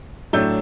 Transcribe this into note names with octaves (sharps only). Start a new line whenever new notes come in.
A2 F#3 A3 D4 E6 G6